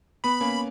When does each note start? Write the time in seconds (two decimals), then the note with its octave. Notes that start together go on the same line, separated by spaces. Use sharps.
0.24 B3 B5
0.41 A#3 C#4